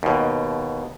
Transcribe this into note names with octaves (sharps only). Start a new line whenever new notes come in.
D#2 B2